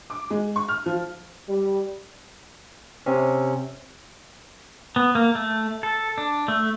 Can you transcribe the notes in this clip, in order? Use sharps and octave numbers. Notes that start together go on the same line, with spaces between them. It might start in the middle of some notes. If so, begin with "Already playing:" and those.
D6
G#3
C#6
F6
F3
G3
C3 C4 C#4
B3
A#3
A3
A4
D4
A3